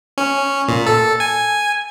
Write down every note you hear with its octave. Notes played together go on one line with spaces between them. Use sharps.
C#4
A#2
A4
G#5